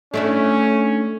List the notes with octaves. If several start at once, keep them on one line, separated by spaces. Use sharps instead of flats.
A3 C#4 D4 E4